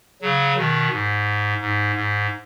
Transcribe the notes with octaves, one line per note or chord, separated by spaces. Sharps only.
C#3 F#3
B2 D#3
G#2
G#2
G#2